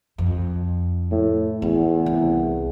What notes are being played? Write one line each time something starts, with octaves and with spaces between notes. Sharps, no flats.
F2
A2
E2 E4
C2